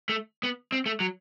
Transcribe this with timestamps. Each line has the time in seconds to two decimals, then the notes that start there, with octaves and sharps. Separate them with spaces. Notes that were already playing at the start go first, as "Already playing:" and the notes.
0.09 A3
0.43 B3
0.72 C4
0.86 A3
1.00 F#3